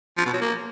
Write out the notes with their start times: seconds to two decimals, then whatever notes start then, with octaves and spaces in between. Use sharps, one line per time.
0.18 F3
0.26 B2
0.34 F#3
0.41 A#3